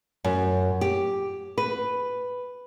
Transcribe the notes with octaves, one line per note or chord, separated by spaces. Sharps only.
F#2
G4
B4